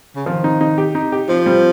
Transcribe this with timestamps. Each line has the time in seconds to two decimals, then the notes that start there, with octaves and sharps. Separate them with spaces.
0.16 C#3
0.26 D#3 F3
0.44 D#4
0.61 D#4
0.78 G4
0.95 D#4
1.12 G4
1.29 F3 C4
1.46 G3